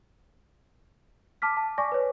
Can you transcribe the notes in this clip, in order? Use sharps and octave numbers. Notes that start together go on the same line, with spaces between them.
A5 D6 F6 B6
A5
D5 G#5 C#6 D6 A#6
B4 C#5